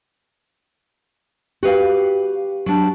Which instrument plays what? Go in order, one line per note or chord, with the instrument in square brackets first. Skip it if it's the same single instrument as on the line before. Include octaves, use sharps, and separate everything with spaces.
[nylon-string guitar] F#4 B4 F5 [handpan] G4
[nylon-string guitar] F#3 D4